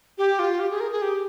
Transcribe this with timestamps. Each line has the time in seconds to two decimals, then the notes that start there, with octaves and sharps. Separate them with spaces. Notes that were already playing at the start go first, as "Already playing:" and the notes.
0.18 G4
0.39 F4
0.60 G4
0.71 G#4
0.80 A#4
0.91 G#4
1.02 G4